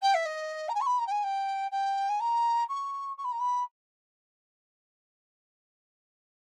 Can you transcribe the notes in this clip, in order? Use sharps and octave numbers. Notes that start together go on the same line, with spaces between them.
G5
E5
D#5
A#5
G#5
C#6
B5
A#5
G5
G#5
G5
G5
G#5
A#5
C#6
C#6
B5
A#5
B5